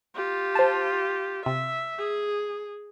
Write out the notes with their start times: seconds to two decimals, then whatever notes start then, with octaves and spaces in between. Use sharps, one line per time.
0.15 F4 G4
0.55 C5 A5
1.46 C3 E5
1.99 G#4